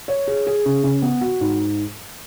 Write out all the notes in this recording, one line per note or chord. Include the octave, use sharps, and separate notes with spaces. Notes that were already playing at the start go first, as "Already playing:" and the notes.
C#5
G#4
G#4
C#3
C#3
B3
F#4
G#2